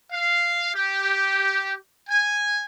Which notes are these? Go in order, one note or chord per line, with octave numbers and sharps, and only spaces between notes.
F5
G4
G#5